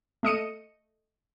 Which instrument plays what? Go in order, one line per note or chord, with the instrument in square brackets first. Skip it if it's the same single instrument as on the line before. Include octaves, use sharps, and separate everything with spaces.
[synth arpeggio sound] A3 D#5 C#7 D#7